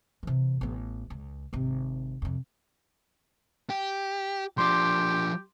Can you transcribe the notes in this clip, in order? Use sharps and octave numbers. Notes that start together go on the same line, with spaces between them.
C3 E3
A1 B3
C#2
G#1 C3
F2 C3
G4
F3 D4 G4 C6 D6